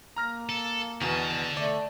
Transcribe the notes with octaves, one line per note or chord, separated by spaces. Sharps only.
A#3 A#5 F6 A#6
A4
E2 B2 D3 A5
A3 D5